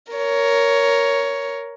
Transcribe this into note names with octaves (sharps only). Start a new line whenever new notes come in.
A#4 C#5